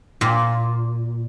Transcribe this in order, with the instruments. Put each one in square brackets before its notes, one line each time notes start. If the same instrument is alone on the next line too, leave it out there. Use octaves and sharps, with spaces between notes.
[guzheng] A#2